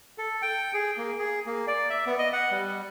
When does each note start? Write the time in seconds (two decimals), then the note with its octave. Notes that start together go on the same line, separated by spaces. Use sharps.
0.18 A4
0.42 G5
0.74 G#4
0.97 A#3
1.19 G#4
1.46 A#3
1.68 D5
1.90 E5
2.06 B3
2.18 D#5
2.33 F#5
2.51 G3